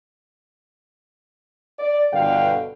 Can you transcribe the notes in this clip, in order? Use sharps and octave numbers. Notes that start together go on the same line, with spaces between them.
D5
G1 G2 B2 D3 F5 G5